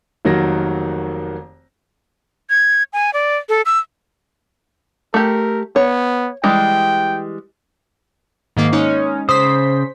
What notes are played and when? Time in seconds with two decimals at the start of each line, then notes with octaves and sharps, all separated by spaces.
0.25 F1 D#3 F#3 A#3 F#4 A#6
2.50 G#6
2.93 G#5
3.14 D5
3.49 A4
3.66 E6
5.14 A3 G4 A#4
5.76 B3 C#5
6.44 E3 G3 G#3 G5
8.57 G#2 D#3 A#3
8.72 G#3 C#4 D#4
9.29 C#3 C5 D#6 B6